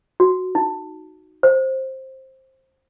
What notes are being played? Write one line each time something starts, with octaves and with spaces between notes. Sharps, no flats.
F#4
D#4
C5